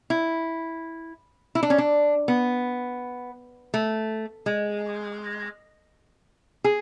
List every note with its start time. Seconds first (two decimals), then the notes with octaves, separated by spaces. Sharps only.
0.10 E4
1.55 E4
1.63 D4
1.70 C#4
1.78 D4
2.28 B3
3.74 A3
4.46 G#3
6.64 G#4